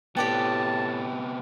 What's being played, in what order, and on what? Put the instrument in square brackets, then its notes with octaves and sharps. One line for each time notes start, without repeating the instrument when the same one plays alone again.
[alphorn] A2 [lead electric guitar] C3 B3 [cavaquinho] G4 D5 G5 [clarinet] A5